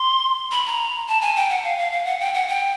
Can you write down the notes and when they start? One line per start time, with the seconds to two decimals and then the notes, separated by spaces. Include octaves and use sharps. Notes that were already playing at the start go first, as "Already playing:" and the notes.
Already playing: C6
0.52 B5
0.66 A#5
1.08 A5
1.22 G#5
1.36 G5
1.50 F#5
1.64 F5
1.78 F5
1.92 F5
2.05 F#5
2.20 G5
2.34 F#5
2.48 G5